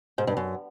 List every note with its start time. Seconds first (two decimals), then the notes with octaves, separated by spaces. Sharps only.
0.18 G#2
0.27 G2
0.37 F#2